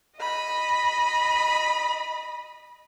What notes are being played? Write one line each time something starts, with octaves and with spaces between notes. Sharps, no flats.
D#5 B5